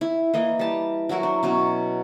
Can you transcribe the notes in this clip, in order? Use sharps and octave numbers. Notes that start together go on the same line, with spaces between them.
E4
E3 A#3 D#5
G3 A5
F#3 E4 F#4 A#4
D4
B2 F#3 C#4